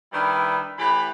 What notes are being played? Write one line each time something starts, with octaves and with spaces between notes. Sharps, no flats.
D#3 G3 D4 E4 B4
A2 E3 G4 B5